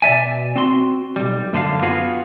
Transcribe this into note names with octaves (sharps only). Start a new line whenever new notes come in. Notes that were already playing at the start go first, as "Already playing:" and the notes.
B2 D5 E5 G#5
C4 F#4 C6
B1 G3
F#2 D3 C5 F5
B3 F4 F#4 G#4 F5